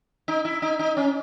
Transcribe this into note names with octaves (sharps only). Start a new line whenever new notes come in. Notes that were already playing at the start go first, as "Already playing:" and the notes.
D#4
E4
D#4
D#4
C#4